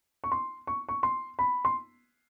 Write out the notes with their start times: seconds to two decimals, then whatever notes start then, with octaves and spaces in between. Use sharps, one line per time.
0.24 C#6
0.32 C6
0.67 C#6
0.89 C#6
1.03 C6
1.39 B5
1.65 C6